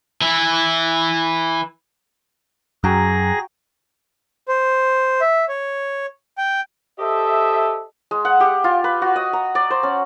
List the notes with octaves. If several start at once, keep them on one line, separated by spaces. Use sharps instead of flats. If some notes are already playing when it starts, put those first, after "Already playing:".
E3 E4
F#2 F#4 G#4 G5 A#5 A#6
C5
E5
C#5
G5
G4 A4 C5 D#5 E5
G#3
F#5
G4
F4
B4
F#4
D#5
A#5
D5
C5
C#4